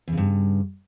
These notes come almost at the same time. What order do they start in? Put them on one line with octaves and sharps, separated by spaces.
E2 C#3 G2